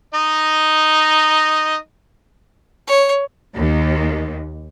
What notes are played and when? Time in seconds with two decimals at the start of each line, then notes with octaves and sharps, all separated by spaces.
0.14 D#4 D#5
2.87 C#5
3.56 D#2